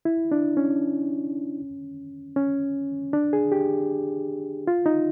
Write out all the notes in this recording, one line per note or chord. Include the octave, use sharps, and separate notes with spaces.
E4
D4
C#4
C#4
D4
G#4
G4
F4
D#4